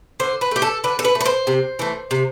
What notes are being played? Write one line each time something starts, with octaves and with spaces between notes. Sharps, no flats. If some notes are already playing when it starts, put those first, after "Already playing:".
D3 C5
B4
A3 G4
A4
D3 B4
A4
B4
A3
B4
C5
C3
E3 A3
C3